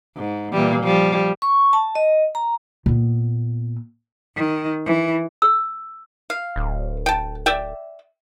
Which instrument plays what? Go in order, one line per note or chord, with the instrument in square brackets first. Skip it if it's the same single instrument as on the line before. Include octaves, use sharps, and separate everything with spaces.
[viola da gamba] G#2
A#2 E3 G3
F3 G3
[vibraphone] C#6
A5
D#5
A#5
[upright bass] A#2 B3
[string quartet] D#3
E3
[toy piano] E6
[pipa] F5
[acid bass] D1
[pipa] G5 A5
D5 E5 G5